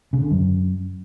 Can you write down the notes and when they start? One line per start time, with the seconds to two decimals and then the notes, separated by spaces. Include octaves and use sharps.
0.13 C#3
0.22 D3
0.31 F#2